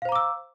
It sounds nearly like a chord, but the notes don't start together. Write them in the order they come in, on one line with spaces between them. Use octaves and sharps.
F5 C5 A#5 D6 E6